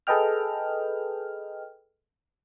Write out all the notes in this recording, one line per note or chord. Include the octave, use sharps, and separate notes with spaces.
G#4 A4 B4 D#5 G5 F6